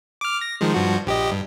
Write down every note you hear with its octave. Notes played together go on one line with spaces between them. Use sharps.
D6 F6
A#6
D#3 F3 G#3
G2 F3 F#4
A#1 G4 D#5
G2